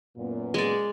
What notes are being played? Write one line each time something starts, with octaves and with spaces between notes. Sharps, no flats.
F#2 A#2 B3
G#3 D5